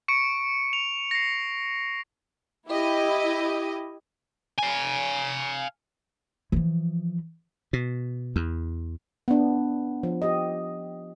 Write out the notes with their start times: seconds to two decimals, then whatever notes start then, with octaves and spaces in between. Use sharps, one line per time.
0.08 C#6 C#7 D7
0.73 F7
1.11 A#6 C7
2.68 E4 G4 D#5
4.59 F5 G#5
6.52 E3 F3
7.73 B2
8.36 E2
9.28 B3 D4
10.03 F3
10.22 G4 D#5